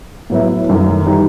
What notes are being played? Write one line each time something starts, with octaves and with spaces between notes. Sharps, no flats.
A2 F#3 B3 E4
F#2 D#3 A3
E3 G3 D#4